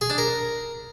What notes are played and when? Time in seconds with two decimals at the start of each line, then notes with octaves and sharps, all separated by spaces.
0.01 G#4
0.10 D4
0.18 A#4